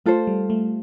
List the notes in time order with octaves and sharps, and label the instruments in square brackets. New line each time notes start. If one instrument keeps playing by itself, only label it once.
[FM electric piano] A3 [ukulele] F4 A4 C5
[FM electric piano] G3
A3